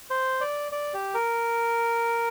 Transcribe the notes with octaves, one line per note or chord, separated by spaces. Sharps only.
C5
D5
D5
G4
A#4